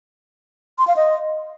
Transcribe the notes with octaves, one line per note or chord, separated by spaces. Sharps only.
C6
F5
D#5